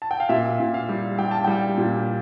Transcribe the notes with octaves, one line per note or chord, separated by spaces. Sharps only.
A5
G5
F5
A#2 E5
A#2
F5
G3
G3 G5
A5
G3 G5
A#2